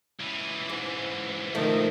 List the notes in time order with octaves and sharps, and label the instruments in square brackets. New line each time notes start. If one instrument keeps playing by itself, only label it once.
[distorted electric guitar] C#2 E3
[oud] G#2
[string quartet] D#3 [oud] F3 A3